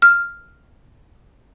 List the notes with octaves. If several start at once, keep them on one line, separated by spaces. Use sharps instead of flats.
F6